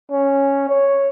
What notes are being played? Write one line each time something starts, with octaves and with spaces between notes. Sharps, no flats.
C#4
C#5